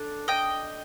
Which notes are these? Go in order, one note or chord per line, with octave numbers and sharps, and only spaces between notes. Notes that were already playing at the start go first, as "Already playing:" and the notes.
Already playing: D4 A4
D#5 G5